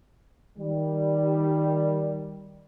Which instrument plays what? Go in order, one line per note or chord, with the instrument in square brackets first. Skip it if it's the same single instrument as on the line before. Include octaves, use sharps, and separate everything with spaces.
[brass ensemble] D#3 G3